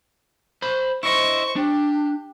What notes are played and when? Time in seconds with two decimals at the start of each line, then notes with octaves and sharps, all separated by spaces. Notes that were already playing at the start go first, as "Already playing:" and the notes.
0.62 C5 B5
1.03 E4 C5 D#5 C#6
1.56 D4 G4